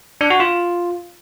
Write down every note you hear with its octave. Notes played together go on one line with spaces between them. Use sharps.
D4
F#4
F4